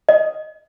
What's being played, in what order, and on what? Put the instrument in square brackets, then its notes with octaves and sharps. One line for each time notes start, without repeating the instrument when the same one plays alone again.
[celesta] D#5